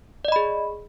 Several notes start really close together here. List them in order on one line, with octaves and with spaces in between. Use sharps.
D5 D#5 B5 G#4